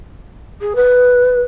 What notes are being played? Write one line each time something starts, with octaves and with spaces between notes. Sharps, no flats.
G#4
B4